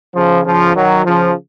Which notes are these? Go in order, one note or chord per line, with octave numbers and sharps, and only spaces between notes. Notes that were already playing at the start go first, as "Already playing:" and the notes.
C#3 F3
C#3 F3
D#3 F#3
C#3 F3